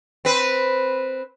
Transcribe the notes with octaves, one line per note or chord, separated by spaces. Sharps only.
C4 B4